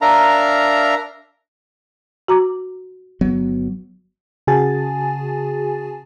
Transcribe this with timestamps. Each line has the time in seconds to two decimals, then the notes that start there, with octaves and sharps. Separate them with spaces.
0.02 D4 A#4 E5 F5 A#5
2.28 F#4 A#5 D6
3.21 G1 F#3 B3
4.47 C#3 F#4 G#4 G#5 A5 A6